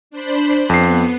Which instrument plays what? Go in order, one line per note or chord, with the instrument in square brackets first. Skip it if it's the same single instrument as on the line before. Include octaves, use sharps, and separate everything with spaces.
[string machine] D4 C5 B5
[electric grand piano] F2 C7 [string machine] B3